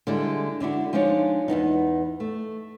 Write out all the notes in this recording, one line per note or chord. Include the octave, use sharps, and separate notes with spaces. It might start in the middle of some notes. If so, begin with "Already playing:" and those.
D3 G3 G#3 D4 E4
D3 D4 E4 F#4
F3 G#3 D4 D#4 C#5
E2 G#2 B3 D#4
A3